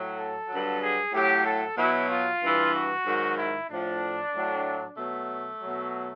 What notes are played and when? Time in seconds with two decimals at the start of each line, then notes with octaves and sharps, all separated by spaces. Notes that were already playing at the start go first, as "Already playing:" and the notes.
Already playing: A2 F#3
0.16 A4
0.49 G2 D3 F#3
0.80 G#4
1.12 A2 F#3 G4
1.44 A4
1.76 B2 F#3 E4
2.08 F4
2.40 G2 E3
2.73 F#4
3.04 G#2 D#3 F#3
3.37 E4
3.68 A2 F3 D4
4.33 A2 F#3
4.97 B2 F#3 A3
5.60 B2 F#3